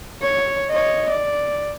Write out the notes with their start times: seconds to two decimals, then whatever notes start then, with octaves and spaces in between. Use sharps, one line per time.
0.22 C#5
0.70 C#5 D#5
1.10 D5